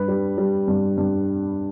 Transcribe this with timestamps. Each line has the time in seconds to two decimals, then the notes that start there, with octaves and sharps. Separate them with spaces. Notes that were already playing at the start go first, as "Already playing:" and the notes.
Already playing: G2 B4
0.08 G3
0.38 G3
0.67 G2
0.97 G2